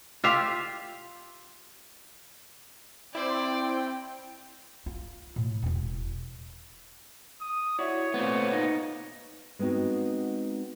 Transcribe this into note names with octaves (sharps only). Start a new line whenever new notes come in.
F4 G4 E5 F5
C4 E4 C5 D5 G5
F4
A2
E1 E4
D#6
E4 F#4 C#5 D5
A#2 A3 B3 C4
D#4
G#3 B3 C4 D#4 F#4